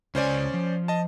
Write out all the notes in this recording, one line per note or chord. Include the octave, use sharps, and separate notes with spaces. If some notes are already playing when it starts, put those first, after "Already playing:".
C#2 C#4 C5 D5 G#5
F3
D#5 A5